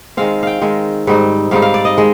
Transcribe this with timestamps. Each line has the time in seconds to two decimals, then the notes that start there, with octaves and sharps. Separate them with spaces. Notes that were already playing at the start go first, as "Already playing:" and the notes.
0.17 D#3 G#3 C4 F5
0.43 F5 G5
0.61 D#3 G#3 C4
1.07 G#2 G3 C4 D#4
1.51 G#2 G3 C4 D#4 F5
1.62 F5
1.74 D5
1.85 D#5
1.97 D#3 G#3